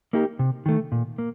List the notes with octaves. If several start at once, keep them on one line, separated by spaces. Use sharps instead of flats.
A#3 D#4 G4
C3
D#3 A3
A#2
A#3